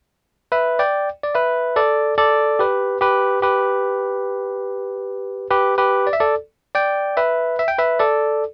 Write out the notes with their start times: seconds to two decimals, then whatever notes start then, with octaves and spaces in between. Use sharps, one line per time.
0.52 B4 E5
0.79 D5 G5
1.24 D5
1.35 B4 E5
1.76 A4 D5
2.18 A4 D5
2.59 G4 B4
3.01 G4 B4
3.42 G4 B4
5.51 G4 B4
5.78 G4 B4
6.07 D5
6.13 E5
6.20 A4 D5
6.75 D5 G5
7.17 B4 E5
7.59 E5
7.68 G5
7.78 B4 E5
7.99 A4 D5